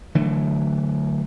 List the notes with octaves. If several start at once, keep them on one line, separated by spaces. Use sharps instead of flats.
D3 E3 F#3 A3